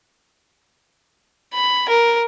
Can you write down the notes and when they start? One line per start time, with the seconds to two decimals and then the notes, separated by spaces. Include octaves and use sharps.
1.54 B5
1.89 A#4